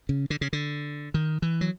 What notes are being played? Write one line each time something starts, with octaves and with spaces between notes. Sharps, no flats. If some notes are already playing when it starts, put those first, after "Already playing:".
C#3
D3
C#3
D3
D#3
E3
F#3